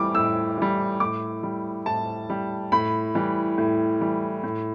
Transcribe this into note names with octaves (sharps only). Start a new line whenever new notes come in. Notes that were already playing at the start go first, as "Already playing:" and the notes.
Already playing: A2 E3 G3 D6
A2 E6
E3 G3
A2 D6
G3
A2 A5
G3
A2 B5
E3 G3
A2
E3 G3
A2